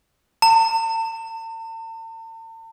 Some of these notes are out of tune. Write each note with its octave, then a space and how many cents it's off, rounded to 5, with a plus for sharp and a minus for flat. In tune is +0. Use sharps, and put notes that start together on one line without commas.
A5 +45